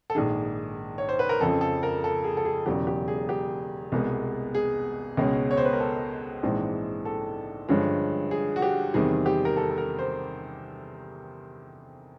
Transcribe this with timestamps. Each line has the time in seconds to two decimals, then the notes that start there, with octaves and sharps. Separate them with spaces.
0.10 A4
0.15 A#1 G#2 D#3 G#4
0.98 C#5
1.09 C5
1.19 B4
1.29 A#4
1.41 F2 C#3 F3 A4
1.61 A4
1.83 A#4
2.04 A4
2.24 G#4
2.37 A4
2.45 G#4
2.66 E1 E2 C#3 F#3 G4
2.87 G4
3.08 G#4
3.29 G4
3.92 C2 B2 G#3 B3
4.55 G#4
5.17 C#2 B2 G#3 C#4
5.51 C#5
5.57 C5
5.65 B4
5.73 A#4
5.80 A4
6.43 A#1 G#2 E3 G#3 C4
7.05 A4
7.68 G2 D3 F3 G#3 C#4
8.31 G#4
8.56 F#4
8.62 G4
8.94 E2 C3 D#3 G3 C4 G#4
9.26 G4
9.45 A#4
9.57 A4
9.71 A4
9.78 A#4
9.99 C5